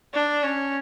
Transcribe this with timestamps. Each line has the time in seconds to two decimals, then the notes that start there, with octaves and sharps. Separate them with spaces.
0.14 D4
0.43 C#4